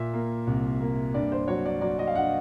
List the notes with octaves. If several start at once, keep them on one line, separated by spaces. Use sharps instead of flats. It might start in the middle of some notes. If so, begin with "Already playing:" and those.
Already playing: A#2 E5
A#3
C2
A#3
G2 D5
C5
F#3 C#5
D5
F#3 D5
D#5
F5
G2 F#5